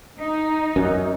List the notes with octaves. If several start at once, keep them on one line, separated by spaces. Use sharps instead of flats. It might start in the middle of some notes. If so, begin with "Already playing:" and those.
D#4
F#2